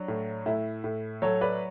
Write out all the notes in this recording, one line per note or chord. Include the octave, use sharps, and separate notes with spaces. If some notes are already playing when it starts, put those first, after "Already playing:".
Already playing: F#3 D4
A2
A2 E4
A2
F#3 A4 C#5
B4 D5